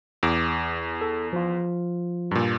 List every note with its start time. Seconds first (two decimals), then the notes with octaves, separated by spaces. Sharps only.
0.23 E2 D6
1.01 A4
1.33 F3 F4
2.31 G2 A#2